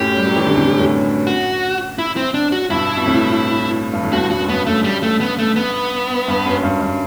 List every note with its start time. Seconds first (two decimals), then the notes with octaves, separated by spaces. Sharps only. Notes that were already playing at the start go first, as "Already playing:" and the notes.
Already playing: F#2 A2 G4
0.17 G3
0.26 F#3
0.36 E3
0.45 D3
0.55 A2 C3
0.79 F#2 A2
1.27 F#4
1.98 E4
2.16 C4
2.34 D4
2.52 F#4
2.70 G2 B2 E4
2.97 B2
3.06 A2 C3
3.93 G2
4.03 A2
4.13 G2 B2 F#4
4.31 G2 F#4
4.40 F#2
4.49 G2 B3
4.66 G2 A3
4.84 G3
5.03 A3
5.21 B3
5.39 A3
5.56 B3
6.28 G2
6.46 F#2
6.63 G2
6.81 G2